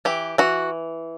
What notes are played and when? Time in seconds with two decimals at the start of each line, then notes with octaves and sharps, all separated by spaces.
0.05 E3 G4
0.38 E3 F#4